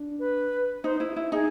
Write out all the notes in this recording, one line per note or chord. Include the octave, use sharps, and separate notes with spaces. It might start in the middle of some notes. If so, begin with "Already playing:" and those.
Already playing: D4
B4
D#4 C5
E4
E4
D#4 G#4